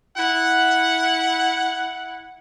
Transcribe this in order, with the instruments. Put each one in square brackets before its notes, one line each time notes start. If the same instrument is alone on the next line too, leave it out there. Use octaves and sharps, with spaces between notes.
[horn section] E4 F#5